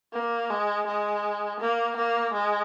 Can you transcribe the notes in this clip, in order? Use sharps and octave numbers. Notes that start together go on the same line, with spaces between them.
A#3
G#3
G#3
A#3
A#3
G#3